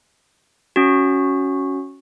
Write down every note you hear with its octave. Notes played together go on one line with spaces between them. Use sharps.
C#4 F#4